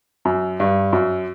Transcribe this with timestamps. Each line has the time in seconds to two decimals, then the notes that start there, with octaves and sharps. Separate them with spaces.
0.25 F#2
0.60 G2
0.93 F#2